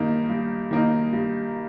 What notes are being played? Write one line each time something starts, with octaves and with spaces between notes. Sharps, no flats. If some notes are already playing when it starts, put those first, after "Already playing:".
Already playing: G2 D#3 A#3 D#4
G2
D#3 A#3 D#4
G2